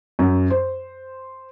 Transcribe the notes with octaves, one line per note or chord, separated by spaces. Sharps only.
F#2
C5